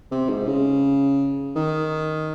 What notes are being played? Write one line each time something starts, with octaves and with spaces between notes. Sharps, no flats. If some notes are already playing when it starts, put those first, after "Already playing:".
C3
G#2
C#3
D#3